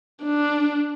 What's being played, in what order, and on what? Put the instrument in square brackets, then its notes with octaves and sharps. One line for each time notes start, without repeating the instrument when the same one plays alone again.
[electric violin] D4